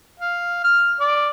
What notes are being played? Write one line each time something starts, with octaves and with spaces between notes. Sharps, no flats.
F5
F6
D5